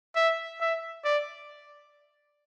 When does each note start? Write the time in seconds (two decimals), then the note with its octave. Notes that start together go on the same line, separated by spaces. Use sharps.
0.16 E5
0.61 E5
1.05 D5